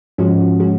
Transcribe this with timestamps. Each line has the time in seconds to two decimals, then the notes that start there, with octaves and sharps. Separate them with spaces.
0.18 G#2 F3 G#3 C#4 F#4
0.59 F3 G#3 C#4 F#4